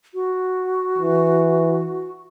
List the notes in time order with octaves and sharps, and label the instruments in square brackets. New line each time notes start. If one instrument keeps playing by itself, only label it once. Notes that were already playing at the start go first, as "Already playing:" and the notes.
[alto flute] F#4
[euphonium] E3